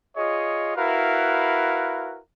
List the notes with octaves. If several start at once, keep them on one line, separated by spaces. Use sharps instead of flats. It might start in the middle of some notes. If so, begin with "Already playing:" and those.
F4 G#4 C#5 D#5
E4 F#4 A#4 B4 F5